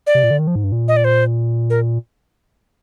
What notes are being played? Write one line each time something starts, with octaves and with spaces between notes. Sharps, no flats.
D5
C3
A#2
D3
D#3
F3
G#2
G2
A#2
D#5
D5
C5
A#4